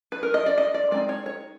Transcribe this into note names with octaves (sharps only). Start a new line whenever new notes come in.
B4
A#4
D#5
D5
D#5
D5
G#3 C4 D#4 D5
C#5
C#5